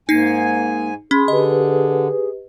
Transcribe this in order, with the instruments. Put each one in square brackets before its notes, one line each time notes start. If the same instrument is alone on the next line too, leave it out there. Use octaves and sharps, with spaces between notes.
[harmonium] G#2 G#5 [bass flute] A#3 [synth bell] D#4 C7
[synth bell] C#4 [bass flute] G#4 [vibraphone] B5 C6
[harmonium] D3 [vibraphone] G4 B4 [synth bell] D#5